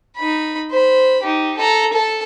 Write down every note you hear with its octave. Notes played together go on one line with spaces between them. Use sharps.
D#4 B5
C5 B5
D#4 G4
A4 A#5
A4 A5